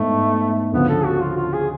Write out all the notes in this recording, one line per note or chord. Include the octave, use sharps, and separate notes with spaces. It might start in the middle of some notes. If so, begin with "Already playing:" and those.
Already playing: G#2 G#3 A3 B3
D2 C#3 F3 B3
A4
F#4
F4
F4
G#4